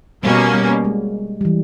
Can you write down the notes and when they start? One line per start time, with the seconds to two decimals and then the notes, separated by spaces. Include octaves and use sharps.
0.23 B2 G3 A#3 C#4
0.54 G3
0.84 G#3
1.41 G3
1.45 E3